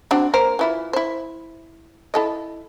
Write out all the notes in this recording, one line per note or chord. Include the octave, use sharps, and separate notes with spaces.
C4 D4 F#4
A#3 A#4 C5
E3 E4 F4
E4 C5
E4 A4 D#5